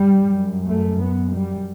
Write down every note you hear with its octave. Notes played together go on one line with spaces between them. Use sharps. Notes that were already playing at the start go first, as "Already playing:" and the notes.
Already playing: G2 G3
F#2
A3
B3
G3